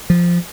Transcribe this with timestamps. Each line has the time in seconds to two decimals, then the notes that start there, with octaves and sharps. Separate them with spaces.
0.10 F3